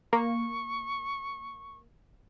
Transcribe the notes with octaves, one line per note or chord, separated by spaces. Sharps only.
A#3 C#6